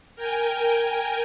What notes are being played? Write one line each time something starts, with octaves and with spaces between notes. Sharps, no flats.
A#4 G5 G#5